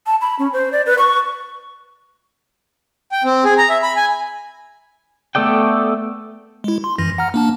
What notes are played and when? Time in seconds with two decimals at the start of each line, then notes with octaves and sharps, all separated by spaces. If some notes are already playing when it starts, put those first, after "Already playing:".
0.07 A5
0.21 B5
0.39 C#4
0.53 C5
0.72 D5
0.86 B4
0.99 C#6
3.12 G5
3.24 C4
3.44 G#4
3.58 A#5
3.69 E5
3.83 B5
3.96 G#5
5.35 A3 B3 A4 D5 G5
6.64 G#3 E4
6.84 C6
6.98 F#2 E3 A#6
7.18 F#5 A#5 F6
7.34 A#3 D4 A5